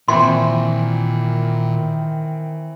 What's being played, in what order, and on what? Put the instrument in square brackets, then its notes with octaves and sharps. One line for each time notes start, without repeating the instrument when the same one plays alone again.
[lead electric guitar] A#2 A5 [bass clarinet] D#3 [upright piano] E3 C4 [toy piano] C6